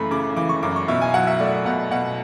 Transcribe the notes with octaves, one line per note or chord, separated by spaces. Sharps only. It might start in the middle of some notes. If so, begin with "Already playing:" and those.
Already playing: F#2 C#3 E3 A3 B5
C#3 D6
E3 D6
C#6
F#2 D6
C#6
B2 E5
G#5
F#3 F#5
E5
A3 D5
B2 F#5
B2 F#5